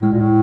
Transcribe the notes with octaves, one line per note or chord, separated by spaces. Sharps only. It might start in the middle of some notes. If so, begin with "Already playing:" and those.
A2 G#3
A#2
A2